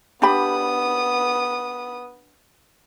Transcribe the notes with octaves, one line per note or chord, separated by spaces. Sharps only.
B3 D4 G4 B5 D#6